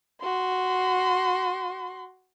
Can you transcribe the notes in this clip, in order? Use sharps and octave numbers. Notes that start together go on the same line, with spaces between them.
F#4 C6